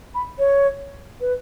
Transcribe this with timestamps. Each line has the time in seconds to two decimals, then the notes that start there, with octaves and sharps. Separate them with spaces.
0.15 B5
0.39 C#5
1.21 B4